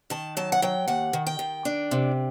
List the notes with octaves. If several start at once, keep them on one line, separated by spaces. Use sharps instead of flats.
D#3 A5
F#3 A5
F#5
F#3 G5
D#2 F#5
D#3
G5
D#3
D4
C3